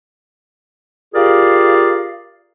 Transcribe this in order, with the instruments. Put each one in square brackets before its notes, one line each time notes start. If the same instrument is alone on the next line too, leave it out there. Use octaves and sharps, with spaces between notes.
[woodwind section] F4 G4 G#4 A#4 D5 F5